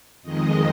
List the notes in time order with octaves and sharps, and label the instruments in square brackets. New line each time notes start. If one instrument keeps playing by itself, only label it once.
[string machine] F2 D#3 G#3 D#5